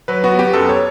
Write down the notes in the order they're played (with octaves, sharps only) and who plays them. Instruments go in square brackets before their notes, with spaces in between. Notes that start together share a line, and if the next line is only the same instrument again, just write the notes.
[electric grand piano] F#3 B4
B3 F#4
B3 G4
F#2 A4
C#5